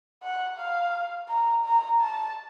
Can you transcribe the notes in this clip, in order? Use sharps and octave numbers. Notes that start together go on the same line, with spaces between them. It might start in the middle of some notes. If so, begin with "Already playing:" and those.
F#5
F5
A#5
A#5
A5